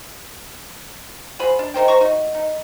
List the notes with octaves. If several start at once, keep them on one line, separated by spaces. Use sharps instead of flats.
F#4 G#4 C5 B5
D4
D#4 A#4 C5 G5
D#3 C5 A#5 C#6
D#4 F#4
D#4